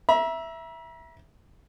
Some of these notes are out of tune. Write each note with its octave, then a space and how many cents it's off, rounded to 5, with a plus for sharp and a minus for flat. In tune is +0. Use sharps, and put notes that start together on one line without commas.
E5 +0 A#5 +40